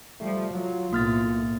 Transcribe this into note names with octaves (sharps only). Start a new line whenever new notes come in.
F3 G3 A3
F#3 F4
B1 A2 A#3 F6 A6